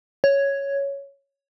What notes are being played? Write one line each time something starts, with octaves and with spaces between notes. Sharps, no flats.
C#5